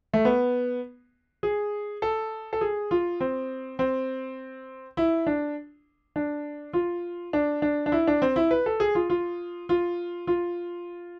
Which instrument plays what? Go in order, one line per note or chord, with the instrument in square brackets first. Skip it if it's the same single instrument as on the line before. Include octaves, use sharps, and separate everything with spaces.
[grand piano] A3
B3
G#4
A4
A4
G#4
F4
C4
C4
E4
D4
D4
F4
D4
D4
D4
E4
D4
C4
E4
B4
A4
G#4
F4
F4
F4
F4